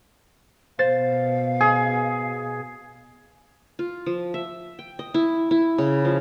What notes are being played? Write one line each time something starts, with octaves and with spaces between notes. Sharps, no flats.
B2 C5 F5 A6
G#4
F4
F3
E5
G5
D#5
E4
E4
C#3
F3